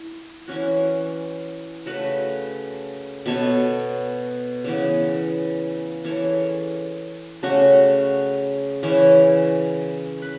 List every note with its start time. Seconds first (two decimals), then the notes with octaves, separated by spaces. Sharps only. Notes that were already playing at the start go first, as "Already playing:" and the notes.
Already playing: E4
0.48 E3 C#4 F#4
1.86 C#3 A3 F#4 B4
3.26 B2 B3 A4 C#5
4.64 C#3 E3 B3
6.04 E3 C#4 A4 C#5
7.43 C#3 A3 C#4 F#4
8.83 C#3 E3 C#4 E4
10.22 B4